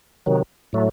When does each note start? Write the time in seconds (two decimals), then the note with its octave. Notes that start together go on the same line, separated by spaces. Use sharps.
0.26 C3 D#3 F#3
0.73 A2 F#3 A3